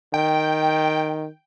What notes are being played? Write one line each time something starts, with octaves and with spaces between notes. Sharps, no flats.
D#3 G5